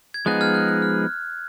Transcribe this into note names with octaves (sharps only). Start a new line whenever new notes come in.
G#6
F3 G#3 B3 D#4 G#4 F#6
F6 G#6
F#6
F#6
F6